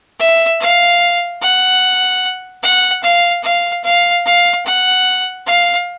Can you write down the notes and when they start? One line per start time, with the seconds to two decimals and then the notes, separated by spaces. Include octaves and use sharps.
0.20 E5
0.60 F5
1.41 F#5
2.63 F#5
3.03 F5
3.44 F5
3.84 F5
4.25 F5
4.66 F#5
5.47 F5